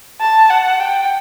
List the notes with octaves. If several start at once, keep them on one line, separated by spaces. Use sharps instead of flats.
A5
F#5
G5